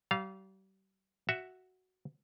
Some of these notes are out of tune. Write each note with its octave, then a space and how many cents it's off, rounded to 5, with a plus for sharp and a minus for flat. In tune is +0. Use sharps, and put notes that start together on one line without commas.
G3 -40 F5 -5
F#4 +0 E5 +0